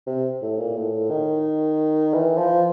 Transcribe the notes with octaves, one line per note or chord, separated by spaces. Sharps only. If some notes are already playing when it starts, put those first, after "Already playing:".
C3
A2
A#2
A2
D#3
E3
F3